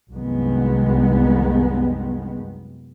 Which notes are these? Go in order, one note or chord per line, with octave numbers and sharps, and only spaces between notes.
C2 F#2 D#3 G#3 B3